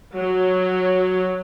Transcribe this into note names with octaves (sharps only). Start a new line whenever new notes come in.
F#3